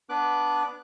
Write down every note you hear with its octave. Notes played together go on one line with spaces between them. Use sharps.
B3 D4 B4 D6 F#6